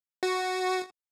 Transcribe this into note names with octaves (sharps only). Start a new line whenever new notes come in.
F#4